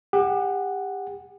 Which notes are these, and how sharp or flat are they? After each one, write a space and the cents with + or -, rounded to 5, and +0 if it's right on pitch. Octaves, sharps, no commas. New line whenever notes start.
G4 +30 F#5 +0